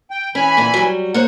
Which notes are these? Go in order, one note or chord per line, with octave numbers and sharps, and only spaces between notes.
G5
E3 C#4 G#5 B5
A#2 D3
F#3 G3
A#3 C5 C#5 F#5